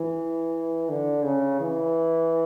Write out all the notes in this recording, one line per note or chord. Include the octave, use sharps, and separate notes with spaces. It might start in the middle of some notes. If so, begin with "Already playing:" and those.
Already playing: E3
D3
C#3
E3